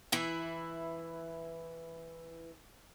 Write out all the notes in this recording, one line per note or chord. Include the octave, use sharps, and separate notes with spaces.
E3 E4